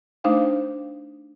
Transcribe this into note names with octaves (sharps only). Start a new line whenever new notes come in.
A3 D4 D#4 C5 F5 G5